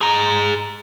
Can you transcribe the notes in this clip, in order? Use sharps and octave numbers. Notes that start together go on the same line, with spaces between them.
G#4 A#5